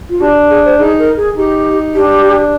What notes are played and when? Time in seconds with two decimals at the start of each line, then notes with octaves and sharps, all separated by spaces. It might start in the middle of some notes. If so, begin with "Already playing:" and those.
0.09 F4
0.20 D4 G4
0.49 G#4
0.65 C5
0.79 D#4 G#4
0.98 A#4
1.17 G#4
1.36 D#4 G4
1.94 D4 G4